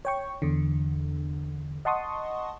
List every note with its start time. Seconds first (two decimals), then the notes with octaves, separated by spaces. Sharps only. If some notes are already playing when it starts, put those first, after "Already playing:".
0.05 C#5 G5 C#6
0.42 E2 D3
1.85 D#5 F#5 A5 C6 C#6 D#6